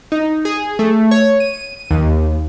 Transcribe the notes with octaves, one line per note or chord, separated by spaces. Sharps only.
D#4
G#4
A3
C#5
D#7
D#2